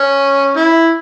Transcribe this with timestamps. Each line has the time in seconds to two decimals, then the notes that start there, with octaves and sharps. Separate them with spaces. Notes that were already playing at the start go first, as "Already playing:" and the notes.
Already playing: C#4
0.57 E4